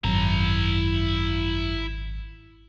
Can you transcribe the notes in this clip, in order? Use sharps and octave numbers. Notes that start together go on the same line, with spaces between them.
G#1 F#2 E4 A#5